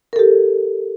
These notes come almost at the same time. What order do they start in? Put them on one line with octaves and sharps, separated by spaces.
A#4 A4 G4